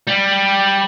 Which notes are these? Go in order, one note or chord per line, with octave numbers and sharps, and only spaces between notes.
G3